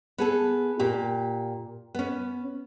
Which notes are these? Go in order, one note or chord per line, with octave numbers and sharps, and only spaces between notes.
B3 G#4 A4
A#2 G4
B3 C#4